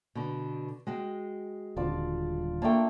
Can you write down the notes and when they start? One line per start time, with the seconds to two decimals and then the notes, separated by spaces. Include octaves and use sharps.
0.15 B2 D3
0.87 G#3 F#4 G5
1.77 D#1 D3 F4 D5 A5
2.62 A3 A#3 D4 G5 A5